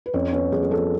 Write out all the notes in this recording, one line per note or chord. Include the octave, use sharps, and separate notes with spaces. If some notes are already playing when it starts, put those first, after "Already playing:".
B4
F2 C#4 C#5
B3 C#4 C#5
F2 G#4
G#4
F3 A4